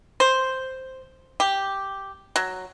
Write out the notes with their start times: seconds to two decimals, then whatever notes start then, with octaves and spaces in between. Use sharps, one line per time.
0.20 C5
1.40 G4
2.36 F#3